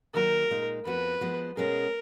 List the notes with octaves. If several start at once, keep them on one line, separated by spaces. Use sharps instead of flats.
D#3 F#3 A#3 D#4 F#4 A#4
A#2 G#3 D#4
F2 F3 B3 F#4 B4
F3 G#3 B3 F#4
B2 G#3 C#4 G#4 A#4